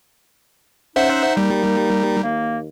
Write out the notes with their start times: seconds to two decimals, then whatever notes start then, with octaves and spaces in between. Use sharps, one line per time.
0.96 C#4 D#4 C5 E5 F#5
1.37 G3 A#3
2.24 D#2 A#3